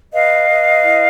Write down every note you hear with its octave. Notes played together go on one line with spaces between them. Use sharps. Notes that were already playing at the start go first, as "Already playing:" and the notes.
B4 D#5 F5
B4
E4